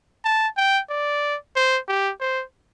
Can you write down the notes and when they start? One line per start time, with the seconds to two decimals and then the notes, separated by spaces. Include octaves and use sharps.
0.25 A5
0.57 G5
0.90 D5
1.56 C5
1.88 G4
2.20 C5